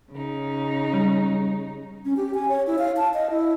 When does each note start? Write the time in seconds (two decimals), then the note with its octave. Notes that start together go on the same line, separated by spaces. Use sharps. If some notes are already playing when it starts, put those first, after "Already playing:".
0.12 C#3 D#4
0.94 G3
2.05 C#4
2.17 G4
2.34 G#5
2.49 C#5
2.67 E4
2.79 F5
2.97 A5
3.14 D#5
3.30 E4